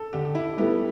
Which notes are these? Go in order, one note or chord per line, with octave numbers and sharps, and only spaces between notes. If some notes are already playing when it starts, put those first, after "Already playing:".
Already playing: A4
D3 G4
G4
E4
G3 B3 E4 G4 A4